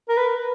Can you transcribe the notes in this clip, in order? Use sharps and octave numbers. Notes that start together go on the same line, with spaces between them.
A#4
B4